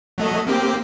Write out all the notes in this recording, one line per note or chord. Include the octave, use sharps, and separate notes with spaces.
F#3 A3 D#5
A#3 C4 G4